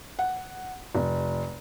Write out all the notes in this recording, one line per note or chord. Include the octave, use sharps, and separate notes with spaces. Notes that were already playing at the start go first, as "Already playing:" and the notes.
F#5
F1